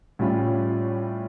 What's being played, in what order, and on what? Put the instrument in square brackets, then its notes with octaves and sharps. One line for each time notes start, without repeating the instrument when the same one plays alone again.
[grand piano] A2 G3 C#4 F4